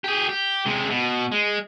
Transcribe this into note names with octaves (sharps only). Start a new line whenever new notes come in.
G4 G#4
G4
C3 G#3
B2
G#3